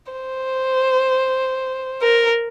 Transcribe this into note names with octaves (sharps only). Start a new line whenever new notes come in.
C5
A#4